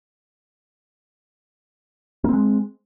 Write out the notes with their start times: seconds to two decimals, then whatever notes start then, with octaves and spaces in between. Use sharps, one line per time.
2.24 A#3
2.29 C4
2.33 G#3